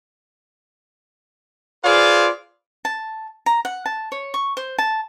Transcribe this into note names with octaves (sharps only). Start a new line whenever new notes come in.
F4 G#4 B4 C5 D5 F5
A5
A#5
F#5
A5
C#5
C#6
C5
A5